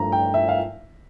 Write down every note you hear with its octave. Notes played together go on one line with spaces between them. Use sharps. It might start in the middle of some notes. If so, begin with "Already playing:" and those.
Already playing: G2 F3 A3 A#5
G5
E5
F5